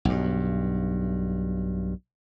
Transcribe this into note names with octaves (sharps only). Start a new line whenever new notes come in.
B1 G2